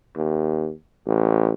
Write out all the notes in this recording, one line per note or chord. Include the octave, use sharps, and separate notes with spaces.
D#2
A1